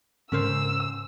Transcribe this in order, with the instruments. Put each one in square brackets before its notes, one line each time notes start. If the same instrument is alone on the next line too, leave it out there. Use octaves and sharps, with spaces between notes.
[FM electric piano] G#2 C#3 [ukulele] C#4 A#4 C5 [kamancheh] E6